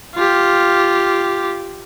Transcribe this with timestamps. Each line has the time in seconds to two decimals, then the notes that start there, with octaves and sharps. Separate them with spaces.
0.15 F4 G4